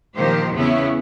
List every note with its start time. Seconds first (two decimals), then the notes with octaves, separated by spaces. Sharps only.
0.15 A#2 D#3 F3 G4 C5
0.53 E2 C#3 B3 C#4 E4